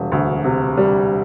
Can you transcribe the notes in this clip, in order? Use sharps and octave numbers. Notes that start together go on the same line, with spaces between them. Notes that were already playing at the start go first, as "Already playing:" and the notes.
Already playing: E1 C3 G3
D2
C3
G3